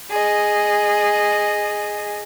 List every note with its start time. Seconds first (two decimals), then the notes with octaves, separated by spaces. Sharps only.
0.11 G#4 D#5